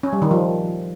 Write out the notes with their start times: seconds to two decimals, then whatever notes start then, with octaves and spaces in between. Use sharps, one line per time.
0.03 C#4
0.13 G3
0.22 D#3
0.31 F3